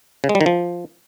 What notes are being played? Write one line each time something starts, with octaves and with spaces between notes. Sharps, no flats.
C#3
G#3
G3
D#3
F3